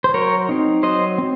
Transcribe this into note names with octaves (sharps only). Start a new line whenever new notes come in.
C5
F#3 A#4 C#5
C4 D#4
F#3 C5 D#5
C4